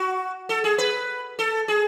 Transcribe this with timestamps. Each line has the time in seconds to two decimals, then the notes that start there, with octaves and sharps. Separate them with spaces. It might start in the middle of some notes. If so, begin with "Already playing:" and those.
Already playing: F#4
0.49 A4
0.64 G#4
0.78 B4
1.39 A4
1.68 G#4